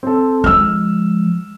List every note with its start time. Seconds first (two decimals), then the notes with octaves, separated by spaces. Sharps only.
0.03 C4 A4
0.44 F3 G#3 E6 F6